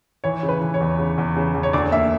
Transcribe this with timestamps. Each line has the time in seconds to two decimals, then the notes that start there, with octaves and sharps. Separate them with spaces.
0.24 E3 C#5
0.43 C#3
0.49 B4
0.61 E3
0.74 C#5
0.81 E2
0.99 C#3
1.18 E2
1.36 C#3
1.55 E2
1.63 C#5
1.73 D2 D5
1.92 A#3 E5